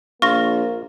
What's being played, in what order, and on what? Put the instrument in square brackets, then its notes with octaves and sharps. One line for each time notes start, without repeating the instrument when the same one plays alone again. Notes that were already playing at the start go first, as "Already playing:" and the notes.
[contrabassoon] A#1 [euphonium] A#3 [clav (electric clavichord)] F4 [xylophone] C#6 A#6